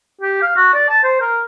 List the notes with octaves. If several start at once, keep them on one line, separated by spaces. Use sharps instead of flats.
G4
F5
F#4
D5
A5
C5
A#4